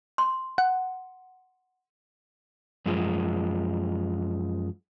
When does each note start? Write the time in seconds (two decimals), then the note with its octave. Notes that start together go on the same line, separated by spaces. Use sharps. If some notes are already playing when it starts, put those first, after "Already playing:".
0.18 C6
0.58 F#5
2.86 F#2 F3 G#3